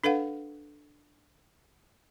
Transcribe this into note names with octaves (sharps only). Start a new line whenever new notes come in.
D4 A4 B4 F5 F#5